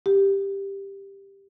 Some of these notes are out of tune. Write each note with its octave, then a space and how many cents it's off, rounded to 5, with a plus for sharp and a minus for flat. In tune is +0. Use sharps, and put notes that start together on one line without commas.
G4 +10